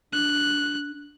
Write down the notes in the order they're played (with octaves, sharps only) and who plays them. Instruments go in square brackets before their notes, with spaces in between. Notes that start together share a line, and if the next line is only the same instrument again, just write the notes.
[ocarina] D4 [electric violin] F#6